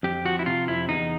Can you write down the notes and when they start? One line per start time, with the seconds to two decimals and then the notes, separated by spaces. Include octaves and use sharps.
0.03 F2 G4
0.25 F3 F#4
0.39 E4
0.46 C3 F4
0.68 F2 E4
0.89 E2 D#4